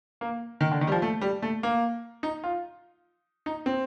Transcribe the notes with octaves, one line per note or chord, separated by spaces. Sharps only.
A#3
D#3
D3
D#3
G3
F3
A3
G3
A3
A#3
D#4
F4
D#4
C4